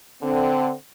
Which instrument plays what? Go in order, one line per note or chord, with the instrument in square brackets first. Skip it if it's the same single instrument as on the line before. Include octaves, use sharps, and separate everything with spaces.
[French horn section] D3 C4